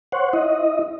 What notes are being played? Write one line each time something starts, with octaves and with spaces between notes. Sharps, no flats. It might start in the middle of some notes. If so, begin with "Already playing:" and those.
C5 C#5 F#5
E4 D#5